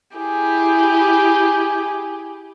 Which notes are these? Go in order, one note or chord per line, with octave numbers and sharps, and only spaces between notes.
E4 G4 G#4